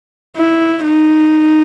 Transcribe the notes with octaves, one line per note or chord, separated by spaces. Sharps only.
E4
D#4